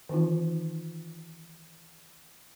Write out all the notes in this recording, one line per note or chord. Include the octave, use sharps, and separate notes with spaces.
D#3 E3 C4 D#4 F4